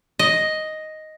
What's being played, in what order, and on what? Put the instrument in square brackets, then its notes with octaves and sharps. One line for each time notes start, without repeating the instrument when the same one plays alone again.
[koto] D#5